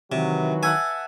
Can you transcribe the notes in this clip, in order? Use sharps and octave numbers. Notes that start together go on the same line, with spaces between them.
C3 D#3 E3 F#3
E5 F#5 G#5 A5